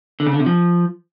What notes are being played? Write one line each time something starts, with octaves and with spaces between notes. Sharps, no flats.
D3
C#3
D3
C3
F3